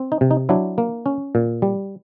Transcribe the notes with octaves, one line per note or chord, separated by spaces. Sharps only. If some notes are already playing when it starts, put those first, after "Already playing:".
Already playing: C4
D#4
C3
D#4
F#3 D4 E4
A#3
C#4
A#2
G3